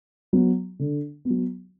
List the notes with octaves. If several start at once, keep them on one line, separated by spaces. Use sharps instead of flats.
F#3 B3
D3
B3
F#3